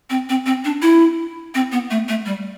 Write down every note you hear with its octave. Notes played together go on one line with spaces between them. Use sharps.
C4
C4
C4
D4
E4
C4
B3
A3
A3
G3